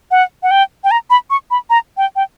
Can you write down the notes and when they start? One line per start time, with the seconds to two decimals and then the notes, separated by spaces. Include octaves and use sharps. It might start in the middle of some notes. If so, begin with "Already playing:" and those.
0.11 F#5
0.43 F#5
0.51 G5
0.84 G5
0.91 A#5
1.10 B5
1.30 C#6
1.51 B5
1.70 A#5
1.97 G5
2.16 G5